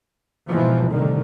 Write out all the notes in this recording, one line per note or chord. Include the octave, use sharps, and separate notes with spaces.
G#2 B2 E3 F3
C2 A2 D3 D#3